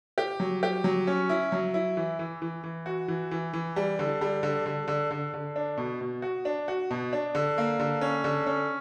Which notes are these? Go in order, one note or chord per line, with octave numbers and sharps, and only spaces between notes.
G4
F#3
G4
F#3
C#4
E4
F#3
E4
E3
E3
E3
E3
F#4
E3
E3
E3
G3
D3
G3
D3
D3
D3
D3
D3
D4
B2
B2
F#4
D4
F#4
B2
D4
D3
A#3
D3
C#4
D3
C#4